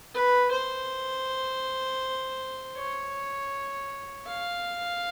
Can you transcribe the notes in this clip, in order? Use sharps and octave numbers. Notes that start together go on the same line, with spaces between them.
B4
C5
C#5
F5